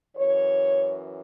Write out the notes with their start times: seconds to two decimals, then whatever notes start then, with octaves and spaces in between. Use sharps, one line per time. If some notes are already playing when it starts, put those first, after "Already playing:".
0.17 F#2 E3 C#5